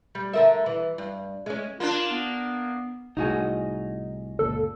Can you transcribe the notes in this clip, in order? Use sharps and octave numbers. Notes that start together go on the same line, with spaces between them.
G3
D3 A#4 E5
E3
G2
G#3 C#4
A#3 D4 F4
B3
C2 A2 D#4 F#4 G#4
F#1 C#2 A#2 A4